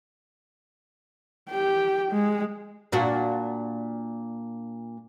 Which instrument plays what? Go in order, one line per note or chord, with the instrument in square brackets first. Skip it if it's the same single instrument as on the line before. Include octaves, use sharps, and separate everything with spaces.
[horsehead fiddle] G4 G5
G#3
[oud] A#2 D4 F#4